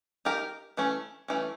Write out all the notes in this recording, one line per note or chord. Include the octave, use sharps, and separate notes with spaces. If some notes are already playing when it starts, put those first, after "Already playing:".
D#4 G4 A#4
E3 A3 C#4
E3 A3 C#4